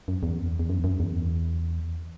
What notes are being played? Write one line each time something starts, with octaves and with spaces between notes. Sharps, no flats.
F#2
E2
E2
F#2
F#2
E2